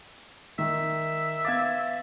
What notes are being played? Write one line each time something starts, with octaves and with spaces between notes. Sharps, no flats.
D#3 E5
B3 F5 D6 G#6 A6